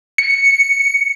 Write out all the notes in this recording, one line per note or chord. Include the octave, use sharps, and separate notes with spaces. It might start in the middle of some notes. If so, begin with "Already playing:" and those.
C#7